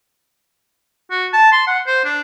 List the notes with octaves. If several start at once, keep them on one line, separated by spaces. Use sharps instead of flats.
F#4
A5
C6
F#5
C5
D4